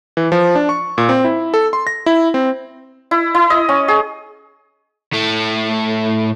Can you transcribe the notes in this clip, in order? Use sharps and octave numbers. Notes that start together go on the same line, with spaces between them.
E3
F3
D4
C#6
A#2
C4
E4
A4
C6
A#6
E4
C4
E4
E4
D#5
C#4
G#4
A2 A3